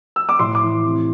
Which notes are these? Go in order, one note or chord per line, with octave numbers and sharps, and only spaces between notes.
E6
D6
A2 C6
D6
E3
C3